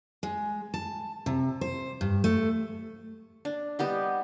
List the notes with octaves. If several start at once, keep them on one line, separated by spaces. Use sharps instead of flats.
G#3
A5
C3
C5
G2
A3
D4
G3 B3 G4 D#5